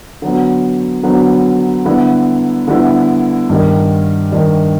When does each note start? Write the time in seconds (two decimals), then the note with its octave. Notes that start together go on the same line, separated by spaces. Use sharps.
0.22 D3 F#3 B3
1.03 D3 F#3 B3
1.85 D3 G3 B3 E4
2.67 D3 G3 B3 E4
3.50 G2 D#3 G3
4.31 G2 D#3 G3